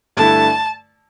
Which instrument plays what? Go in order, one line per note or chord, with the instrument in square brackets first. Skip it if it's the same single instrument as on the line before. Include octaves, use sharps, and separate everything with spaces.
[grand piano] G2 D3 A3 E4 [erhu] A5